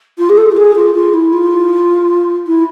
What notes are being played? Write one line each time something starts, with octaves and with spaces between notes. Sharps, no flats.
F4
G#4
A4
F4
G#4
F4
F4
E4
F4
E4